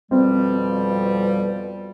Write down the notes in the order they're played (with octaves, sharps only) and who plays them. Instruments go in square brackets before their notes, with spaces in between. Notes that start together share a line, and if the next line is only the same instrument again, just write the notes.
[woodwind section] F2 B2 G3 [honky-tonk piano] C4